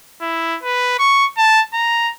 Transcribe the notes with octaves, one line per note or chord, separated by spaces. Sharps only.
E4
B4
C#6
A5
A#5